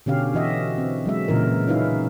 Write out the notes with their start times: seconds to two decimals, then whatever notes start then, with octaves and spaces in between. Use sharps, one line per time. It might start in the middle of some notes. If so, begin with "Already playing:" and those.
0.06 B2 D3 C#4 G4 F5
0.34 E3 F#4 D#5 E5
0.78 C4
1.06 F#3 G#3 E5
1.28 A#2 C#3 E3 A#4
1.68 C#4 D#4 E4 B4 E5 F5